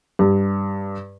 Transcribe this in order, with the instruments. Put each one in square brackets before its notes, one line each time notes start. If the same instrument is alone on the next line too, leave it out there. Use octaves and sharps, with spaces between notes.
[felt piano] G2